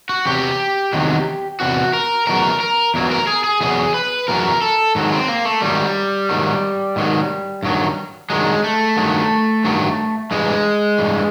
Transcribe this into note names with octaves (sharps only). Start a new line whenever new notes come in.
F#4
E2 C3 F#3 G4
E2 C3 D#3 F#3
E2 C3 F#4
A#4
E2 B2 F#3 A#4
A#4
E2 B2 F#3
A#4
G#4
G#4
E2 B2 F#3 G#4
B4
E2 B2 F#3 A#4
A4
G#2 D#3 F#3
C4
A#3
A3
G#2 D#3 F#3 G3
G#2 D#3 F#3
G#2 D#3 F#3
G2 D#3 F#3
G2 D#3 F#3 G#3
A3
G2 D#3 F#3
G2 D#3 F#3
G2 E3 G#3
G2 E3